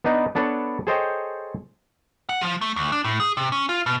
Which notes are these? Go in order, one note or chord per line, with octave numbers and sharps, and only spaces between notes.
B3 D4 D#4 B4
B3 D4 A4 B4 C#5
G#4 A4 C5 C#5 D#5 G5
F#5
F3
A3
D2
D4
A2
G#4
C3
C#4
F4
B2